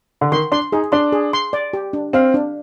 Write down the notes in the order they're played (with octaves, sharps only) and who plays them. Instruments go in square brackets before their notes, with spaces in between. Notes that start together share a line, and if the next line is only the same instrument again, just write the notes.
[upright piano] D3
[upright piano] D#3 [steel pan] C6
[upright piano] D4 [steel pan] C6
[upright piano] D#4 [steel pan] G#4
[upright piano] D4 [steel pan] C6
[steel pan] G#4
C6
D5
G4
D4
[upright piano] C4 [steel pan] F5
[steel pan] D4